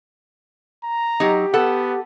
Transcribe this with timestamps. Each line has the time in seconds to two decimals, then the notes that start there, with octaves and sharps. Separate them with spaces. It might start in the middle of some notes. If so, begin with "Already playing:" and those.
0.84 A#5
1.20 F#3 D#4 G4
1.54 B3 A4 F#5